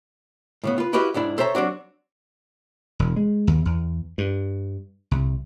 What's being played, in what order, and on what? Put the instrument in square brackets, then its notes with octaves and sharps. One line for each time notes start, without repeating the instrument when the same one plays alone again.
[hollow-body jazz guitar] A2 C#3 B3
F4 B4
E4 F#4 G4 B4 D#5 F5
C#2 G#2 D4 E4
A4 C5 C#5 E5 A#5
F#3 C4 D4 F#4
[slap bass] E1
G#3
D#2
E2
G2
C2